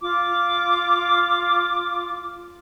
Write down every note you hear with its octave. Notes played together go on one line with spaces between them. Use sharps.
F4 D6